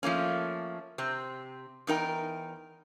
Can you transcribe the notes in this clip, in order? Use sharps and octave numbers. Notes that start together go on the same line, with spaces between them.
F3 A3 A#3 C#4
C3 C4
E2 D#4 A#4 G5